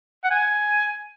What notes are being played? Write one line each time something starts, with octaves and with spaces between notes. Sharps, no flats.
F#5
G#5